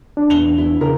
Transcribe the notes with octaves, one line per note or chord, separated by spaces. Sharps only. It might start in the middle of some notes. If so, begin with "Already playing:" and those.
D4
E2 F7 G7
E2 E4
C#3 E4 A#4